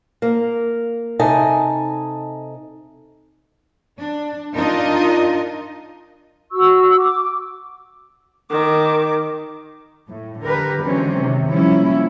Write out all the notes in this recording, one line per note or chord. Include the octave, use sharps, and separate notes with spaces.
A#3
C3 D#4 A4 D#5 G#5
D4
D4 D#4 F4 A#4 D#5
F#4 C#6 E6
D6
D#3 D6
A2
D3 G4 A#4 B4
D3 E3 F#3 G#3 C4 C#4
C3 D#3
F3 G3 A#3 C#4 E4